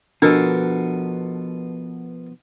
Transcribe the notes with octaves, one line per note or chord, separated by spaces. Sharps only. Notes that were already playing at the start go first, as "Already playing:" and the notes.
B2 F3 B3 D4 A4 A#4